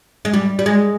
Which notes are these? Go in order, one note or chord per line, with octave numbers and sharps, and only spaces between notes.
G#3
G3
G3
G#3